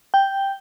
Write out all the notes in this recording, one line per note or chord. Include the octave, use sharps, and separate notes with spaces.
G5